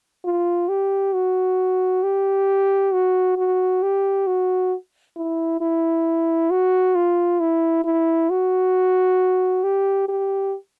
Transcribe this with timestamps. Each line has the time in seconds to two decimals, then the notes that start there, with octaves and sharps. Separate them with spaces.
0.24 F4
0.69 G4
1.14 F#4
2.03 G4
2.93 F#4
3.37 F#4
3.82 G4
4.27 F#4
5.16 E4
5.61 E4
6.51 F#4
6.95 F4
7.40 E4
7.84 E4
8.30 F#4
9.64 G4
10.09 G4